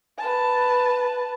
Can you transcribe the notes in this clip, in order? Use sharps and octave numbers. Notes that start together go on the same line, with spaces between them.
B4 A5